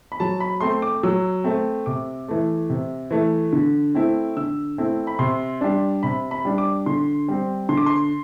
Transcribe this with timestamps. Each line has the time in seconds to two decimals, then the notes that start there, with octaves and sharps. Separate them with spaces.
0.12 B5
0.20 F#3 A5
0.40 B5
0.61 A3 C4 C6
0.82 D6
1.03 F#3 E6
1.44 A3 C4
1.86 C3 D6
2.28 E3 A3
2.70 C3
3.11 E3 A3
3.53 D3
3.95 A3 C4 E4
4.37 D3 E6
4.78 A3 C4 E4
5.07 B5
5.19 C3 C6
5.61 G3 D4
6.03 C3 B5
6.31 B5
6.45 G3 D4
6.58 D6
6.86 D3 C6
7.28 G3 C4
7.69 D3 C6
7.77 D6
7.86 C6